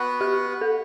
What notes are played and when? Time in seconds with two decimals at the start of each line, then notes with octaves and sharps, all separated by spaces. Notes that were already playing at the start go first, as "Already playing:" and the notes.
Already playing: B3 F#4 B4
0.21 G4
0.61 A4